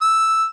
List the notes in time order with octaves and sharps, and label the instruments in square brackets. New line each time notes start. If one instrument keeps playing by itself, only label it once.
[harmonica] E6